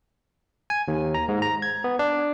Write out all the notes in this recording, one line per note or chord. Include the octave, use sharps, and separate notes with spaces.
G#5
D#2
A#5
G#2
A#5
G#6
B3
D4